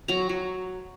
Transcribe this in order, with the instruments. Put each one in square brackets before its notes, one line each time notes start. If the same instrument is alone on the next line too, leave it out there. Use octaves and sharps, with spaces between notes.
[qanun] F#3 A#5
F#3